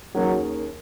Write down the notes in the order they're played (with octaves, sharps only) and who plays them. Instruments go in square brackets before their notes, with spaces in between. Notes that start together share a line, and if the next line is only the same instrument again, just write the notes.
[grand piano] D#2 D#3 A#3 C#4 G#4 [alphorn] F#3